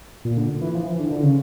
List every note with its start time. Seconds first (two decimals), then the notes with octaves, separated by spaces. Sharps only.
0.25 A#2
0.37 D3
0.61 E3
0.75 F3
0.87 E3
0.99 D3
1.12 D3
1.23 C#3